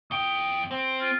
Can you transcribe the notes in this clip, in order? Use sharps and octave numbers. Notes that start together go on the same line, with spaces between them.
F2 G5 D#6
C4
F4